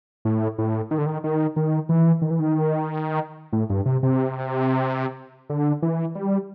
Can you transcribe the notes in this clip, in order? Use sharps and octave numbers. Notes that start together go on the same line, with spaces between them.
A2
A2
D#3
D3
D#3
D#3
D#3
E3
D#3
E3
D#3
A2
G2
C3
C3
D3
E3
G3